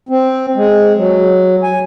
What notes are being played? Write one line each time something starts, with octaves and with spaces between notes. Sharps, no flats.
C4
G#3
F#3
G#5